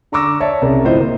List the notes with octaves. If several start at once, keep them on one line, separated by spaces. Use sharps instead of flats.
D3 A#5 C#6 D6 E6 A#6
C#5 D5 E5 A5
C2 C#3 A#4 A#5
D1 A2 F4 C5 D#5
A#3